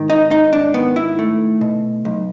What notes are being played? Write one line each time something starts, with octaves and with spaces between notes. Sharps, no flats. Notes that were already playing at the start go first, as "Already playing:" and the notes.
Already playing: G#2 D#3
D#4
G#2 D#4
D4
D#3 B3
E4
A3
B2
B1